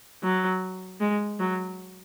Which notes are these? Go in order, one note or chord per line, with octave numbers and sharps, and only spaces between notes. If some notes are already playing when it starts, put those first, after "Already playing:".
F#3
G#3
F#3